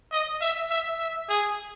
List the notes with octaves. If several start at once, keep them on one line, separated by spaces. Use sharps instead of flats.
D#5
E5
E5
E5
G#4